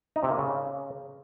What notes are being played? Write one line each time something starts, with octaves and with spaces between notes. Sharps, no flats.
D#4
C3
A#3
C#3